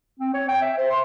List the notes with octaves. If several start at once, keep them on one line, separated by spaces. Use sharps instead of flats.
C4
C#5
G5
E5
C5
C6